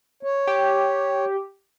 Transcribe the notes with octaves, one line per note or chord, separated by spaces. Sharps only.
C#5
G4